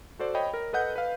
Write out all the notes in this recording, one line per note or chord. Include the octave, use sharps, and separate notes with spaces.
F#4 A4 C5 D5
C#5 D#5 G5 B5
A#4
A4 B4 D#5 F#5 G6
B4 F5